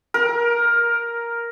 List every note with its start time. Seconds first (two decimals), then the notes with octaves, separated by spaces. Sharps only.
0.14 A#4